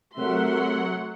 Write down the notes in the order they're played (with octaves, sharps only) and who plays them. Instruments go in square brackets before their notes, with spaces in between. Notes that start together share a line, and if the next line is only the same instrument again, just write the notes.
[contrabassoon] C3 [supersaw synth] F#3 F#5 [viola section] A3 E5 C6 [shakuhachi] A#4